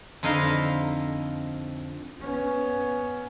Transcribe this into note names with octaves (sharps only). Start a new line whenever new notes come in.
F2 D3 D#4 D#5 F5 B5
B3 C#4